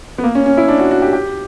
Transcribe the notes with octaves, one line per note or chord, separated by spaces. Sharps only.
B3
A#3
C#4
C#4
E4
D4
F#4
F#4
G4
G4